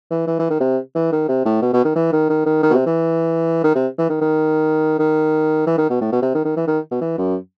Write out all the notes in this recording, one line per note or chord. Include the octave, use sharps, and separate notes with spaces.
E3
E3
E3
D#3
C3
E3
D#3
C3
A2
B2
B2
D#3
E3
D#3
D#3
D#3
D#3
B2
C3
E3
D#3
C3
E3
D#3
D#3
D#3
E3
D#3
B2
A2
B2
C3
D#3
D#3
E3
D#3
B2
E3
F#2